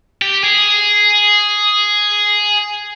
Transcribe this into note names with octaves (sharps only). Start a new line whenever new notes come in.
G4
G#4